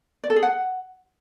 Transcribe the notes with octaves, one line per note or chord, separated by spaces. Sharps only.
D5
A4
G#4
F#5